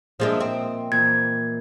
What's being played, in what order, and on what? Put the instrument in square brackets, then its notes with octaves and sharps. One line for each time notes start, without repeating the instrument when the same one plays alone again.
[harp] A#2 D#5 E5 [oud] F3 G#3 D4
[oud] C4
[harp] A#2 E3 [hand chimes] G#6